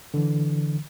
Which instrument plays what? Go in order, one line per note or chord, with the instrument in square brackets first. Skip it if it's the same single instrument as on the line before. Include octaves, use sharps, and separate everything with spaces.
[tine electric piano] D3 E3